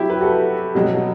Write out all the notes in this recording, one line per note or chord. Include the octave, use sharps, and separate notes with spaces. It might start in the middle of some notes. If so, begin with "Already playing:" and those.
Already playing: C3 F#3 E4 G4
B4
F#4 A4
B2 F#3